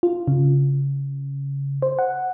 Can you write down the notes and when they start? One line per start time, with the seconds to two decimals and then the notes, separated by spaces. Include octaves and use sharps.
0.03 F4
0.28 C#3
1.82 C5
1.99 F#5